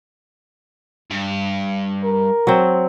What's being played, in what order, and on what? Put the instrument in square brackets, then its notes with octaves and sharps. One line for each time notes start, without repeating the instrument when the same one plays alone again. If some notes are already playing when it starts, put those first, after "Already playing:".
[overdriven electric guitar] G2
[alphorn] A#4
[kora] F#3 C4